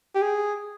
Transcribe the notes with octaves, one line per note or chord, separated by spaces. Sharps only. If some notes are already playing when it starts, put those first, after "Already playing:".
G4
G#4